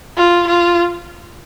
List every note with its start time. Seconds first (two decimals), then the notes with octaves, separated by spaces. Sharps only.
0.17 F4
0.47 F4